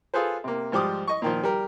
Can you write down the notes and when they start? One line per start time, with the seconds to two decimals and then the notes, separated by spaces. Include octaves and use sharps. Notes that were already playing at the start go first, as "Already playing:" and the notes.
0.14 F4 G#4 A4 B4 C5
0.44 C3 A#3
0.72 G#2 F3 G3 D6 D#6
1.07 D#5 C#6
1.22 A#2 D#3 F3
1.44 G3 A#4